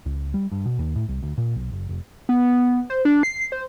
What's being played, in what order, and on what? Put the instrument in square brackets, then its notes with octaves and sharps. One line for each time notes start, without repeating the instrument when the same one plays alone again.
[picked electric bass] C#2
G3
G2
B2
D#2
A2
C2
D2
A#2
B1
F#1
F1
[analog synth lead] B3
C5
D4
C7
C5